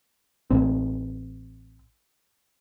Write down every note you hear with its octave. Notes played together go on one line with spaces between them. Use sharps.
A1 C4